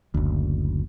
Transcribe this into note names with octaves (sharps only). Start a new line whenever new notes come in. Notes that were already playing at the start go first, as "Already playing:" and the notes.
F#1 D2